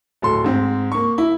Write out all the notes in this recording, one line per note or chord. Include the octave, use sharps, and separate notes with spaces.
D1 A4 C6
G#2 C4
A#3 C#6
E4